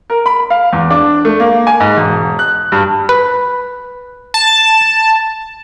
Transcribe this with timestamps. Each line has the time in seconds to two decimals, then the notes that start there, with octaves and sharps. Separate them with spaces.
0.10 A#4
0.26 B5
0.50 F5
0.73 E2
0.90 D4
1.25 A3
1.40 A#3
1.67 G#5
1.80 G#2
1.97 E1
2.39 F#6
2.72 G2
3.09 B4
4.34 A5